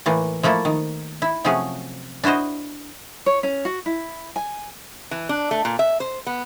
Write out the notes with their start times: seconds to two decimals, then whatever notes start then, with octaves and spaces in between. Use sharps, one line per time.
0.06 A2 E3 A3 A#3
0.43 F3 A3 A#3 E4 A4
0.65 D#3
1.22 E4
1.44 C3 F3 F#3 A3 C#4 G#4
2.24 D4 E4 F#4 C5 D#5
3.26 C#5
3.43 C#4
3.65 F#4
3.86 E4
4.36 G#5
5.11 E3
5.29 D4
5.51 A3
5.65 A#2
5.79 E5
6.00 C5
6.27 B3